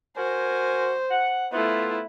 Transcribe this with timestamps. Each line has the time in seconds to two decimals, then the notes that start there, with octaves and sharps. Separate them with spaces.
0.17 F#4 A#4 C5 G#5
1.11 F#5
1.52 A3 B3 E4 F4